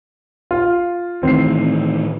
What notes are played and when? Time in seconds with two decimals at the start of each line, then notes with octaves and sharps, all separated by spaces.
0.51 F4
1.23 A2 D#3 E3 C4 C7